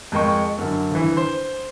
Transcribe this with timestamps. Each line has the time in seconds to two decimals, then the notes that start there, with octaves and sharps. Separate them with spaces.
0.12 F2 G#3 A#4 G5 C#6
0.58 F#2 D3
0.91 G1 E3
1.17 C5